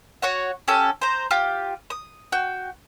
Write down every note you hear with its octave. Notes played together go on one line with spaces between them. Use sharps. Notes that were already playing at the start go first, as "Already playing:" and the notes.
F#4 C#5 F#5
C#4 G4 A4
C5 A#5
F4 G4
D#6
F#4 G5